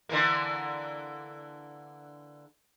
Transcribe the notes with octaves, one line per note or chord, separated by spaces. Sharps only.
D3 E3 A#3